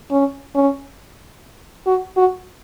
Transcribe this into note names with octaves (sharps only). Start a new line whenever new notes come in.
C#4
C#4
F#4
F#4